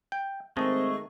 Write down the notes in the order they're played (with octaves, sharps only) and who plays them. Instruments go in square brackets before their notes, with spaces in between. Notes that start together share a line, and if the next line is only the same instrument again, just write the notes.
[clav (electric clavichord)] G5
[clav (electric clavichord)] D#3 A5 [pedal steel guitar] G#3 A3 D#5 [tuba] C4 [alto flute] C#6